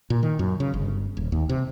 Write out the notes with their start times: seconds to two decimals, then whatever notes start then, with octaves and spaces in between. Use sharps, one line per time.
0.10 A#2
0.23 D#3
0.39 F#2
0.60 C#3
0.74 G1
1.17 D#1
1.32 D#2
1.49 C3